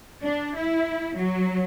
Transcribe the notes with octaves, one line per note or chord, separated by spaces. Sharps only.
D4
E4
F#3